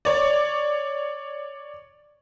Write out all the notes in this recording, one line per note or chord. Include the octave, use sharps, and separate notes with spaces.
C#5 D5